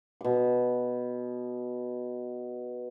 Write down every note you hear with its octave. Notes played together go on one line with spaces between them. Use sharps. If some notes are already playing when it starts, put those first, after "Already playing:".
B2 D6